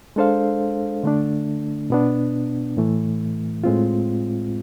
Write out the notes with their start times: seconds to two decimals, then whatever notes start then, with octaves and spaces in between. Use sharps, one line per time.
0.16 G#3 D4 A4 C5 F5
1.03 D3 A3 D4
1.90 B2 B3 D4
2.77 A2 E3 A3
3.64 A2 G#3 C4 F4